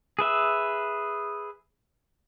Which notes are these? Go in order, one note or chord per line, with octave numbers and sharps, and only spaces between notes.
G#4 B4 E5